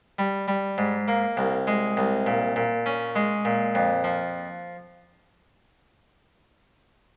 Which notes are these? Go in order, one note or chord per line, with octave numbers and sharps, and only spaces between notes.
G3
G3
G#2
A#3
C2
G#3
C2
A#2
A#2
C#4
G#3
A#2
F2
F3